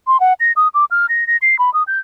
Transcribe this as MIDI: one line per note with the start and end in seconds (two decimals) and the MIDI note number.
0.07 0.20 84
0.20 0.33 78
0.40 0.52 94
0.56 0.68 87
0.74 0.85 86
0.91 1.06 89
1.09 1.27 94
1.27 1.37 94
1.42 1.58 96
1.59 1.73 83
1.74 1.83 87
1.87 1.99 91